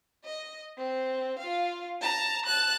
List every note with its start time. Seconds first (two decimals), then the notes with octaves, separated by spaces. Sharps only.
0.25 D#5
0.77 C4
1.39 F4 F5
2.01 A5 A#5
2.46 A5 F#6